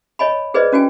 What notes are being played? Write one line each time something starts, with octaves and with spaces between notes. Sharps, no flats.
C#5 D#5 G#5 B5
G#4 B4 C5 D5 D#5
C#4 F#4 G5 G#5